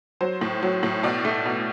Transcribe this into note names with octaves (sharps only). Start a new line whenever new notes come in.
F#3 C5
A2
F#3
A2
B2 D5
A3
B2